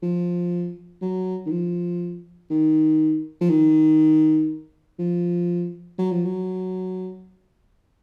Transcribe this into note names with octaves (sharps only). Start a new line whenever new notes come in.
F3
F#3
D#3
F3
D#3
F3
D#3
F3
F#3
F3
F#3